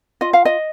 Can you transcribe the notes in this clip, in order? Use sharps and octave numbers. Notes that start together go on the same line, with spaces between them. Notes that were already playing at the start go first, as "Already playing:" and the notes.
F4 D#5
F5
D#5